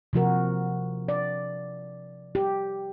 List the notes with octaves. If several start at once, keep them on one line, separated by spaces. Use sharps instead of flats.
C3 F3 F#4 A#4
D5
G4